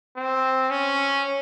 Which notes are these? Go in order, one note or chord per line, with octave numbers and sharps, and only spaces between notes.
C4
C#4